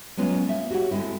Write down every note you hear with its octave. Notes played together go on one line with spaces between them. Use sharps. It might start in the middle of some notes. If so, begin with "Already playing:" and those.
F#3 G#3 B3 C#4 F4
A#3 E5
F#4 G4 C#5 F#5
D3 G#3 C4 E4